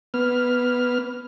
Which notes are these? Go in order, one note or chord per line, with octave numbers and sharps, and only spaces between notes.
B3 F6